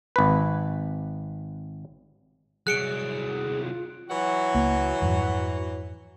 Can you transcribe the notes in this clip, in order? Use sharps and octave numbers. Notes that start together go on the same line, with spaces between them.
G#1 B4
C2 F#3 G#4 F#6 C#7 D7
F4
E3 F#3 F#4
C#2 A#3
F2 G#2 F3